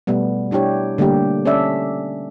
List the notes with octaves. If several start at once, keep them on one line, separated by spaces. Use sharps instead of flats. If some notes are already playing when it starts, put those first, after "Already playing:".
B2 G3 A3 B3
G3 D4 E4 G4 C#5
D3 G3 A3 A#3 G4
C#4 A4 D5 E5